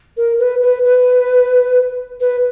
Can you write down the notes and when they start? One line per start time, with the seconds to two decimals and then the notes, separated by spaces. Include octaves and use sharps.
0.17 A#4
0.39 B4
0.62 B4
0.85 B4
2.20 B4